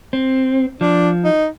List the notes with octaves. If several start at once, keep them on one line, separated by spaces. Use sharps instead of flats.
C4
F3 D4
D#4